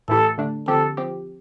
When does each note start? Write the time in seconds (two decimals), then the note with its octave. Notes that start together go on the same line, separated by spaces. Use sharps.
0.08 A2 E3 A3 E4 G4 A4
0.38 D3 A3 D4
0.68 D3 F3 C4 G4 A4
0.97 F3 C4 G4